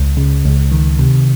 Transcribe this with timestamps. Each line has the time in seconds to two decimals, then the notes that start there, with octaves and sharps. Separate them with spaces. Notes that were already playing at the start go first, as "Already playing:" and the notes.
Already playing: C#2
0.17 C#3
0.44 C#2
0.72 D#3
0.99 C3